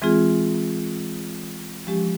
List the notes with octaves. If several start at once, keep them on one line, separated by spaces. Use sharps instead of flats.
E3 G#3 C4 F4 G#4
F3 G#3 C#4 G4